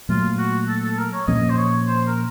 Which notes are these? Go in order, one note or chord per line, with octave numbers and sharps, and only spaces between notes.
A#2 F#3 A3 F4
F#4
A4
A4
A#4
C#5
A#2 F3 A#3 C#4 D#5
C5
C#5
C5
A#4